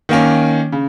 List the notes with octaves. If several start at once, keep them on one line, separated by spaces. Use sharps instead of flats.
D#3 A#3 C#4
C#3